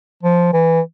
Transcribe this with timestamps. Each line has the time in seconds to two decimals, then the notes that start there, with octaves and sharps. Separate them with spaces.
0.23 F3
0.53 E3